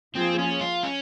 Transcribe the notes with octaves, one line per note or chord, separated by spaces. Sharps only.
F3 A#3 C4 F4 G#4
C#4
F4
C#4